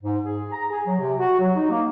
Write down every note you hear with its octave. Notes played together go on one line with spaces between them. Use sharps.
G#2
G#4
A#5
G#4
F#3
C3
F#4
F#3
D#4
A#3